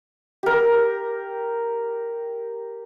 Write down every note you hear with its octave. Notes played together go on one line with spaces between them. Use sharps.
G4 A#4